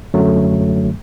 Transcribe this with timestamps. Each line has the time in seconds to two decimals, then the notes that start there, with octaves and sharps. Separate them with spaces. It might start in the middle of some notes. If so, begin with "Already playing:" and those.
0.14 F#2 D3 F#3 A3